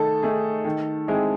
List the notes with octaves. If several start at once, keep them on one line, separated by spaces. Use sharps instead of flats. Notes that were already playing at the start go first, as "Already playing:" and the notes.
Already playing: D#3 A3 D#4 G#4 A4
A3 D#4 G#4
D#3
G#3 C4 E4 G#4